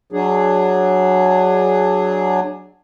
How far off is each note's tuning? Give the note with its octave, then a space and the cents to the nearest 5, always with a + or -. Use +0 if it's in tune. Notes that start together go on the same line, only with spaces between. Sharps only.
F#3 +0 D4 +20 G#4 +0